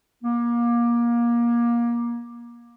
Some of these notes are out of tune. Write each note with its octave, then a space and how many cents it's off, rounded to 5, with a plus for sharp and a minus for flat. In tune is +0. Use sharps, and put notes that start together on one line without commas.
A#3 +25